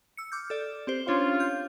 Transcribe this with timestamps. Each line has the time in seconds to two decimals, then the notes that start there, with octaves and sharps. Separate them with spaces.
0.17 E6 C#7
0.32 D6 F6 G6
0.50 A4 D5
0.87 C4 G4 C5
1.08 C#4 D4 F4 C#5
1.40 G6